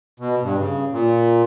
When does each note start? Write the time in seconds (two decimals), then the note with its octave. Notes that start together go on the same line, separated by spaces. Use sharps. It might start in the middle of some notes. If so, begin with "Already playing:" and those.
0.20 B2
0.44 G2
0.59 C#3
0.92 A#2